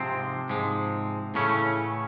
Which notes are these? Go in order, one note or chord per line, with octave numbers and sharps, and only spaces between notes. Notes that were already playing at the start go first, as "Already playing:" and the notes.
Already playing: G#2 C3 F3 G#3 C4
G#2 F3 G#3
A2 C#3 E3 A3 C#4